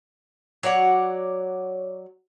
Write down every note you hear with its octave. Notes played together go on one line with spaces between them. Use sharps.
F#3 C#5 D5 F#5